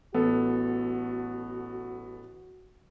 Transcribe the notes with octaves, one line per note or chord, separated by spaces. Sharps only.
A1 B3 F#4 A4